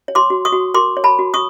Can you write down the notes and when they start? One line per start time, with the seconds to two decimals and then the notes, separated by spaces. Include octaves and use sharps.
0.08 C#5
0.15 C6 D6
0.30 F#4
0.45 C#6 D#6
0.53 F#4
0.74 A#4 C6 D6
0.97 C#5
1.04 A5 B5
1.19 F#4
1.34 C#6 D#6